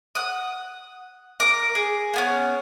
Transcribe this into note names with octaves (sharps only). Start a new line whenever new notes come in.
F#5 D#6
A#4 D6
G#4
A#3 B3 C#4